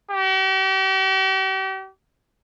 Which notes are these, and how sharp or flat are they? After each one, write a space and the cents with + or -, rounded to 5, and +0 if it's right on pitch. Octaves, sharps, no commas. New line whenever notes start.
G4 -40